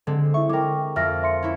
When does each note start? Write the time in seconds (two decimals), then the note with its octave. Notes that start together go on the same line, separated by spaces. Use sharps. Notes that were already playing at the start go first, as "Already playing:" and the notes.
0.07 D3 G#3 C4
0.34 E4 E5 C#6
0.49 G#3 A#4 G5 D6
0.96 F2 E5 F6 A#6
1.23 E5 C6 C#7
1.43 C#4 E4